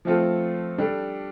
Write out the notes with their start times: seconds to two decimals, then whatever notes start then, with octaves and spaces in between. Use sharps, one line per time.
0.05 F3 A3 C4 F4 A4
0.78 G3 D4 A4